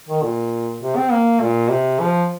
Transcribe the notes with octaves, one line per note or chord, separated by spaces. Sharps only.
D#3
A#2
C3
C4
A#3
A#2
C3
F3